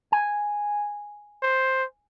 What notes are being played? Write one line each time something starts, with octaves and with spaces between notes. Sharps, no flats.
G#5
C5